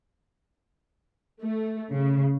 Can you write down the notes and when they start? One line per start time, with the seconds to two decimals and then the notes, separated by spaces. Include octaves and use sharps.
1.42 A3
1.91 C#3